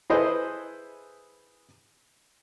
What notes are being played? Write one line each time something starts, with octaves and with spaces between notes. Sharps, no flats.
E4 G#4 A4 B4 C5 D#5